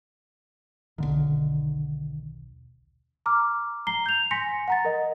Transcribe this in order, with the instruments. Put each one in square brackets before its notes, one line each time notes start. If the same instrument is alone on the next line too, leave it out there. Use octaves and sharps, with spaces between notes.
[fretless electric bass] D#1 B1 [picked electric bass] D3 D#3
[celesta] A#5 D6 F6
A#5 C7 G7
G6 F7
G#5 C6 A#6 B6 C#7
F#5 A#5 A6
A#4 D#5